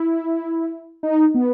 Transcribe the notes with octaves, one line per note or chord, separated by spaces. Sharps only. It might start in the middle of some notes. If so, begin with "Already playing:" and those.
Already playing: E4
D#4
B3